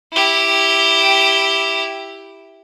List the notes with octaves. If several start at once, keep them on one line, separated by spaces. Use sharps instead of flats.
E4 G4